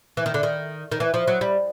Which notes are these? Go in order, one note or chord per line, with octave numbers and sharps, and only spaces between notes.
E3
D#3
D3
D#3
D#3
E3
F3
F#3
G3